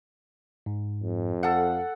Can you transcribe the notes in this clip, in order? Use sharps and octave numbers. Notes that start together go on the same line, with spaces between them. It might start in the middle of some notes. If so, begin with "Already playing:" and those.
G#2
F2
A4 F5 F#5